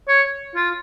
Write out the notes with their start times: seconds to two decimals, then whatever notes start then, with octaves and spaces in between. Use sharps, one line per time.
0.08 C#5
0.55 F4